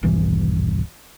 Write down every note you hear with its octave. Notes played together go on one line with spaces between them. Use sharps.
D#1 B1 G2 E3